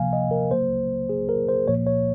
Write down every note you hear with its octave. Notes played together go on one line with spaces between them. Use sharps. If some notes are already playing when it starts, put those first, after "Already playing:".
Already playing: C3 F3 A#3 F5 G#5
D#5
A#4
C#3 F#3 A#3 C5
G#4
A#4
C5
A#2 F3 A#3 C#5
C#5